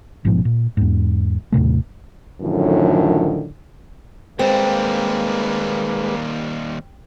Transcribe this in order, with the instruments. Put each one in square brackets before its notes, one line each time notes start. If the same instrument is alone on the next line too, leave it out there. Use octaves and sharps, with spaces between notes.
[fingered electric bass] A1 G#2 B2 F3
A#2
E2 G#2
D#2 A2 C3 A3
[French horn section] F#2 A2 D3 D#3 F3
[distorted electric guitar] D#2 G3 [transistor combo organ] G#3 B4 [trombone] A#3 [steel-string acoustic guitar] C4